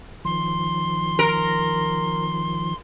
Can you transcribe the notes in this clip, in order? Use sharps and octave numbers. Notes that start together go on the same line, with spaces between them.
D#3 F3 C6
A#4